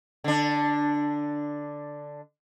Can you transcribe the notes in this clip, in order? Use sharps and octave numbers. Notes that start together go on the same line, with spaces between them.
D3 D4